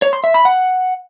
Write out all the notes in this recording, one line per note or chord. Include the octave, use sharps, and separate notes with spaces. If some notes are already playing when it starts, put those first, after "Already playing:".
C#5
C6
E5
B5
F#5